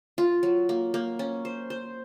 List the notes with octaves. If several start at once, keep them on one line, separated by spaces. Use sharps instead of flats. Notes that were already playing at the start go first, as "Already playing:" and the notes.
F4
F#3
A#3
A#3
C#4
C5
C5